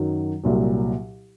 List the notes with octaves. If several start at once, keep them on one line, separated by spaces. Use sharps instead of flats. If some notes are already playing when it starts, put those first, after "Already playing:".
Already playing: F#2 D#3 F#3
C2 A#2 F#3